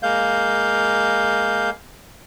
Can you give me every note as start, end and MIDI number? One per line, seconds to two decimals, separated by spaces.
0.03 1.70 56
0.03 1.70 58
0.03 1.70 77
0.03 1.70 91